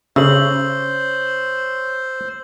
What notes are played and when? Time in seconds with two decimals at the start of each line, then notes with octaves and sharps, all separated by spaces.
0.16 C#3 C5 C#5 E6 F#7